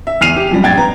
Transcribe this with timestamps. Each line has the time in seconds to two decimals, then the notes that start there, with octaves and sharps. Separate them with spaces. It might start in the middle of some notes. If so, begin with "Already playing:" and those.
0.07 E5
0.21 E2 F6 C7 D#7 F7
0.36 G4
0.51 F#2 F3 G3
0.63 A#1 G2 G5 G#6 A6
0.77 B3 A#5